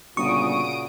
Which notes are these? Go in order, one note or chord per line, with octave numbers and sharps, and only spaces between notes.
G1 A#2 C#3 F#4 C#6 D#6 D7